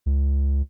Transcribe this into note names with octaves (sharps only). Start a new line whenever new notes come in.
C#2